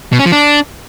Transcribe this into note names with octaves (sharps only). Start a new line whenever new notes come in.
B2
C#4
F3
D4